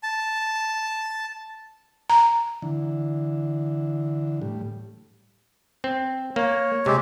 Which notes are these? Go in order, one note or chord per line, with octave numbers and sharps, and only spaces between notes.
A5
A#5
D3 E3
A2 G3
C4
A#3 C#5
C3 G#3 C4 G4